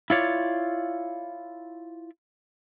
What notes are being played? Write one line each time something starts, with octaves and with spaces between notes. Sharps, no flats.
E4 F4 C#5 D5